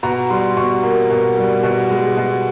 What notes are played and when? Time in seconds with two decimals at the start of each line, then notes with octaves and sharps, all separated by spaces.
0.03 B2 A#5
0.30 G3 C6
0.57 B2 C#6
0.83 A#3
1.10 B2
1.37 G3
1.63 B2
1.90 G#3
2.17 B2